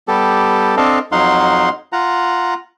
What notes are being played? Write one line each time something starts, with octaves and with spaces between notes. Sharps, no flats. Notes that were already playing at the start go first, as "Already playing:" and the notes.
G3 B3 G4 A4
C4 D4 A4 D#5 F5
F2 F#3 D#4 F5 F#5 C6
F4 F#5 A#5